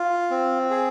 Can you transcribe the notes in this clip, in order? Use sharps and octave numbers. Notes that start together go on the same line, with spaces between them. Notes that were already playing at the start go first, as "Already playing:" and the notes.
Already playing: F4
C4
G#4